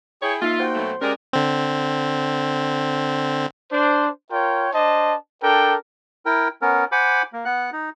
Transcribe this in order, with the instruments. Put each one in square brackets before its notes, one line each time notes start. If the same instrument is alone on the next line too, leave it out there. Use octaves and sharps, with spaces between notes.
[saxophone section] E4 C#5 [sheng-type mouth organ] G#4 G5
[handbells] A#3 D#4 [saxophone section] F4 [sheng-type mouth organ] E5
[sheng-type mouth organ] F#4 G5 [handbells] C5 C6
[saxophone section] B2 F#3 A3
[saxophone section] G#3 A#4 [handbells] C#4 [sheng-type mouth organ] G4 D5
[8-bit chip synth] D3 C4
[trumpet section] D4 C5
F4 A#4 C#5 G5
D4 C5 D#5 A5
D4 A4 A#4 G5
[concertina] E4 A#4 G5
B3 C#4 A#4
C5 F#5 G#5 B5 D6
A#3
B3 F#5 F#6
D#4